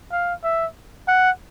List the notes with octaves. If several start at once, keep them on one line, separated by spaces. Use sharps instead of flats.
F5
E5
F#5